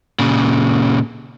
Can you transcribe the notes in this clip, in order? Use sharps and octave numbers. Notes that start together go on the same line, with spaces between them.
A#2 C#3